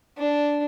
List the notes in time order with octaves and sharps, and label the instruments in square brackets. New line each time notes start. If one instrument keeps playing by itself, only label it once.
[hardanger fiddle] D4